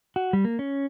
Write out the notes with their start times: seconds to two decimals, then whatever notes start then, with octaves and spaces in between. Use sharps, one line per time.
0.16 F#4
0.33 G3
0.45 A#3
0.59 C#4